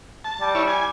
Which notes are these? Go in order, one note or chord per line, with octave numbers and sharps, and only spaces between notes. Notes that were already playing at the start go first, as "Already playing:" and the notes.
A5
G3
E4 C#5
G#5